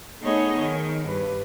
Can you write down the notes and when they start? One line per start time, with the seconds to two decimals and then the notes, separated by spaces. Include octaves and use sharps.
0.22 A3 B3 D#4 G#4 C#5 D#5
0.59 D#3
1.05 G2 B4